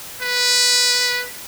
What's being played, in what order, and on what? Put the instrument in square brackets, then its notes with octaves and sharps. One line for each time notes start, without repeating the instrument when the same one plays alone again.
[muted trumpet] B4